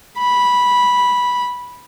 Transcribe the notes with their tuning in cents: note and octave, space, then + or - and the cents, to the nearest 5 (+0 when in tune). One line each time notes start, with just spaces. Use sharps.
B5 -10